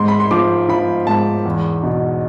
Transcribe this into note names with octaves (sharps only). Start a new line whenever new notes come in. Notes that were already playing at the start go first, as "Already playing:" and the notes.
Already playing: G#2 C6
B5
C6
F3 D6
F3 B5
G#2 A5
E2
B2